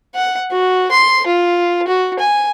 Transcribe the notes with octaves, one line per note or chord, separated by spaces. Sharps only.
F#5
F#4
C6
F4
F#4
G#5